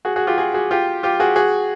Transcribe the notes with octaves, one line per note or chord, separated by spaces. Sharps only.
F#4 G#4
F#4 G#4
F4 G4
F#4 G#4
F#4 G#4
F4 G4
F4 G4
F#4 G#4
F#4 G#4